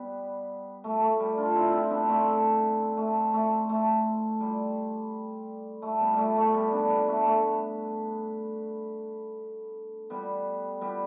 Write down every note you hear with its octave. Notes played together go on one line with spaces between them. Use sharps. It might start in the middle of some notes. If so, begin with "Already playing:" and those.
Already playing: G3 B3
A3
A3
G3
D4 F4
C4 E4
F4
C4 E4
B3 D4
A3 C4
A3
A3
A3
G3
A3
G3 B3
G3 A3
A3
G3 B3
B3 D4
G3 B3
A3
A3
G3 B3
G3 B3